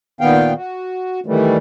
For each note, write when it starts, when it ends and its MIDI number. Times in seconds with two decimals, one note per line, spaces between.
0.21 0.53 46
0.21 0.53 51
0.21 0.53 59
0.21 0.53 77
0.21 0.53 79
0.57 1.20 66
1.26 1.57 51
1.26 1.57 52
1.26 1.57 55
1.26 1.57 57